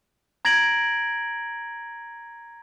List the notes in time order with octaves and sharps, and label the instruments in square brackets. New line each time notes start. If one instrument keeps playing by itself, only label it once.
[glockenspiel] A#5 G#6 A#6 D7 F#7